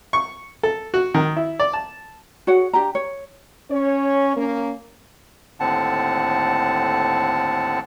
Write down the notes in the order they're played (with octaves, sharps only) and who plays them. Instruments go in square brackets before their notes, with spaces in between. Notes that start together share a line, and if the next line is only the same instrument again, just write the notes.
[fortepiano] C#6
A4
F#4
D#3
E4
D5
A5
[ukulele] F#4 G#4 C#5 F#5
D4 G4 G5 A#5
C#5
[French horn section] C#4 C#5
A#3 C#4
[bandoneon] D#2 A2 D3 C4 F#5 A5